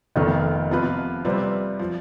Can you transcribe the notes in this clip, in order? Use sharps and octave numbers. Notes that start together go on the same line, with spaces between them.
F1 F2 D#3 B3 F4
C3 F3 B3 F4 B4
C3 G3 C4 F4 B4
F3